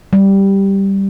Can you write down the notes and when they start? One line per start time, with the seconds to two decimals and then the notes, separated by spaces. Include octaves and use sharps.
0.13 G3